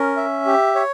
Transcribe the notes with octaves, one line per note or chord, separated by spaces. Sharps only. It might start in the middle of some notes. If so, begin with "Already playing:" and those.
Already playing: C#4 A#4
E5
G4
C#5